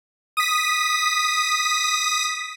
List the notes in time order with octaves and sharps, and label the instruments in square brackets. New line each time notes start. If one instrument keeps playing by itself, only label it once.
[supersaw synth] D#6 B6